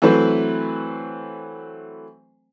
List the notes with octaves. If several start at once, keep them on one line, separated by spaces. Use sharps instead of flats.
E3 F#3 A3 C4 B4 C5